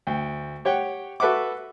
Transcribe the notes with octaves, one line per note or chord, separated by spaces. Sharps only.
D2 G5
G4 C#5 F#5 G5
F#4 A4 B4 E5 F#5 D6